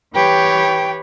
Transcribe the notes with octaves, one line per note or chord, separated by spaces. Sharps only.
E3 G4 B4 C#5 G5